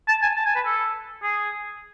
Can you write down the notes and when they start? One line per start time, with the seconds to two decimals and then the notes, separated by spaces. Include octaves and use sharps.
0.09 A5
0.23 G#5
0.37 A5
0.46 G#5
0.56 B4
0.66 A4
1.23 G#4